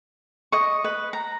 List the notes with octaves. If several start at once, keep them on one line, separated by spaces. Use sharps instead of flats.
D#5 C#6
B4
A#5